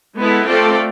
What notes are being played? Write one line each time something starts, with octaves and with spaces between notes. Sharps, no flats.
G#3 B3 E4 A4
A3 C4 F4 A4 D5